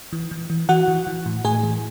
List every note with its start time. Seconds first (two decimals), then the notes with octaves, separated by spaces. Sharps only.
0.13 E3
0.31 E3
0.50 E3
0.69 E3 F#4 F#5
0.88 E3
1.07 E3
1.26 A2
1.45 A2 G#4 G#5
1.63 E3